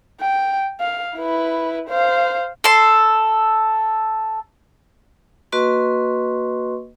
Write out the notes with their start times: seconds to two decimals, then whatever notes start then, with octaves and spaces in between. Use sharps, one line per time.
0.20 G5
0.80 F5
1.16 E4 B4
1.89 C5 F5
2.64 A4 C6
5.52 A#3 F#4 B4 D#5 C6 C#6